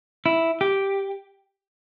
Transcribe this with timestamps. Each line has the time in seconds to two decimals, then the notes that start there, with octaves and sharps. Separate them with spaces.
0.26 E4
0.61 G4